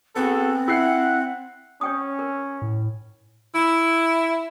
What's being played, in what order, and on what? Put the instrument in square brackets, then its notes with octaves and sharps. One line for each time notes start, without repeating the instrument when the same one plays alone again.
[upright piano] B3 [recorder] C4 [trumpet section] F#4 G#4 A4
[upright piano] E4 C7 [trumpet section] F#5
[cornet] C#4 [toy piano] C#5 G5 D#6
[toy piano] A#4
[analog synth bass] A2
[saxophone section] E4